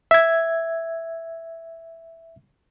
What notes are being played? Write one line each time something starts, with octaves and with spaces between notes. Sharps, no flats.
E5 G#6